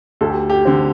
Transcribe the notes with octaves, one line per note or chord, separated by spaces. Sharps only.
D2 A4
G4
G4
D3 C4